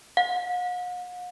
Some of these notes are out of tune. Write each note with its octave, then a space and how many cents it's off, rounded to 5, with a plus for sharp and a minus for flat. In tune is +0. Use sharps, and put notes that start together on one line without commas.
F#5 -45